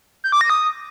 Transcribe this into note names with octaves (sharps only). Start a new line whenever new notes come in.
G6
D6
A#6
D#6